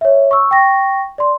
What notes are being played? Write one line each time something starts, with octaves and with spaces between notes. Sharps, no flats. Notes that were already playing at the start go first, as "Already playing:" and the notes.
C#5 E5
C#6 E6
G5 C#6 A#6
D5 C6